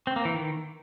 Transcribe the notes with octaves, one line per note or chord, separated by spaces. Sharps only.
C4
A#3
E3
D#3